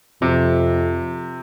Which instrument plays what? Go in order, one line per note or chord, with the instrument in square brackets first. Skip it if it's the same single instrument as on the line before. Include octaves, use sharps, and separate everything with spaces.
[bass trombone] F2 [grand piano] C3